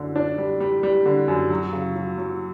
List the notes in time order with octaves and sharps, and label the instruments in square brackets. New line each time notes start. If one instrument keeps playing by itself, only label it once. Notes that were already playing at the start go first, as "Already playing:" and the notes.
Already playing: [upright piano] F#2 D3
D4
G3
G3
G3
D3
F#2
F#3
C#3
F#3
F#3